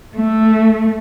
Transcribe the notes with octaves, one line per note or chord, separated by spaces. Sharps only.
A3